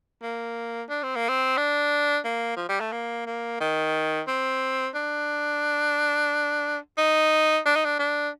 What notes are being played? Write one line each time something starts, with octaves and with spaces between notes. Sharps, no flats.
A#3
D4
C4
A#3
C4
D4
A#3
F3
G3
A3
A#3
A#3
D#3
C4
D4
D#4
D4
D#4
D4
D4